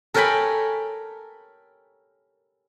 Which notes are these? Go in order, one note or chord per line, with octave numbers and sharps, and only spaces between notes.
A4 A#4 C#5 G5 G#5 B5